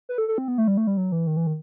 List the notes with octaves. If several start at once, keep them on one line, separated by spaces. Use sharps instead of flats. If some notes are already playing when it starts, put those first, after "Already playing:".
B4
A4
A4
C4
B3
A3
G3
A3
G3
F#3
E3
D#3
E3
D#3